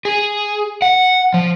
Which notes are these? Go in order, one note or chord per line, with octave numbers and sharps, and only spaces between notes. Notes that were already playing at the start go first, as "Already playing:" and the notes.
G#4
F#5
F3